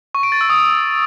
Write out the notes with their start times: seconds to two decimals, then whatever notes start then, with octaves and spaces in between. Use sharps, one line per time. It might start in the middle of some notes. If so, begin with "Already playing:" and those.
0.15 C#6
0.23 D7
0.32 A6
0.41 E6
0.50 D#6